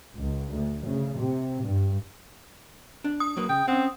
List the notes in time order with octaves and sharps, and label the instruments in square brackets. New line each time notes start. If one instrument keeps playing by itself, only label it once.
[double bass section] C#2
D2
C#3
C3
G2
[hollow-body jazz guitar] D4
[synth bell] D#6
[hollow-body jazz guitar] F#3 A#3 B4
[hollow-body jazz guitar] C#3 [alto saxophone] G5
[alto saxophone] C4 [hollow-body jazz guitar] C#4 F#5